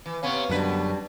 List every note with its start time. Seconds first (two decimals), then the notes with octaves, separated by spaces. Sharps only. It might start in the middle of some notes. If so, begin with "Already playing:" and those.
0.06 E3
0.23 C3 B3 C#4 C#5 F5
0.50 F#2 B2 D3 G3 D4 B4